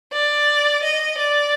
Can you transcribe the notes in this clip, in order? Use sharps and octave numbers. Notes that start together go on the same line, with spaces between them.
D5
D#5
D5